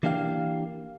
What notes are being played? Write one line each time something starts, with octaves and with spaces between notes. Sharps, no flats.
E3 A#3 D4 G4 F5